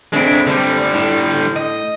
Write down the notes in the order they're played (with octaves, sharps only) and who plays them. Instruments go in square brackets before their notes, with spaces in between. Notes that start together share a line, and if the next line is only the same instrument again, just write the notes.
[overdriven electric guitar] G#3 E4 [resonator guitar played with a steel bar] A3 C4 D4
[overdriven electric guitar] D3 G3
[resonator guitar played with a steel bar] A2
[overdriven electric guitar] D#5